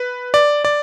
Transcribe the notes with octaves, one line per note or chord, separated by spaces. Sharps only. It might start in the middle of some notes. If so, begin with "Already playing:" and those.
Already playing: B4
D5
D5